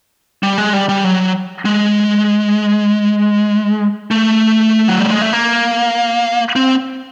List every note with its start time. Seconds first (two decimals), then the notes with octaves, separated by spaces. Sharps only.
0.43 G3
0.58 G#3
0.73 G3
0.89 G3
1.04 F#3
1.65 G#3
4.11 A3
4.88 F#3
5.00 G3
5.11 G#3
5.22 A3
5.33 A#3
6.56 C4